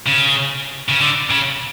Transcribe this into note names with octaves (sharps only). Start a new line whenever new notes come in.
C#3
C#3
D3
C#3